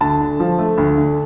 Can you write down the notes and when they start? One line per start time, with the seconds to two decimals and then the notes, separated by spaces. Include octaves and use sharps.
0.01 D2 A5
0.21 D3
0.40 F3
0.59 A3
0.78 D2
0.98 D3